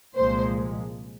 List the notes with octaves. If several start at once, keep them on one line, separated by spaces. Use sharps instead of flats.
C2 A#2 F3 G#3 C5